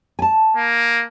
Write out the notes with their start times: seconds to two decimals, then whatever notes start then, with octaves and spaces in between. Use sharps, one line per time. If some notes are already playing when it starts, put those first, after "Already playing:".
0.19 G#5 A5
0.57 A#3